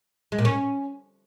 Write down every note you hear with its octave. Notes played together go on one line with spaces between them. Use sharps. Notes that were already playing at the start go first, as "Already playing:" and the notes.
G#3
A#2
C#4